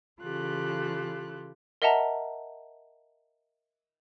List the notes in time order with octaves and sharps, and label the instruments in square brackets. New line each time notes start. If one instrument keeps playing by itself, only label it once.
[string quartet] C#3 E3 F4 G4 A4 F#6
[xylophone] A#4 D#5 E5 F#5 A5 A#5